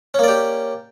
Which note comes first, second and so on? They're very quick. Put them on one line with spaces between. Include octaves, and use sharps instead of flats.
C#4 A#3 D5 G4